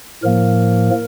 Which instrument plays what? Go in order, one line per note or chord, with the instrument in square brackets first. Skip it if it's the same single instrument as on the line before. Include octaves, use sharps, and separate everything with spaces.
[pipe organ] A2 F3 A#3 A#4